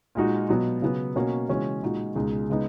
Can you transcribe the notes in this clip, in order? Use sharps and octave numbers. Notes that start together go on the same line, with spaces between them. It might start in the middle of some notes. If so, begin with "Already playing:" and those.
A#2 G#3 D#4 F#4
B2 F#3 B3
C#3 F#3 B3
B2 A#3 C#4 F#4
C#3 E3 G#3 C#4 F#4
A#2 G#3 D#4 F#4
C#2 B2 G#3 D#4
C#3 G#3 B3 D#4